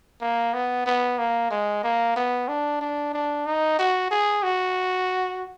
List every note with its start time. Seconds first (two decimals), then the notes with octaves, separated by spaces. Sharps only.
0.21 A#3
0.54 B3
0.86 B3
1.19 A#3
1.51 G#3
1.84 A#3
2.16 B3
2.48 D4
2.81 D4
3.14 D4
3.46 D#4
3.79 F#4
4.11 G#4
4.43 F#4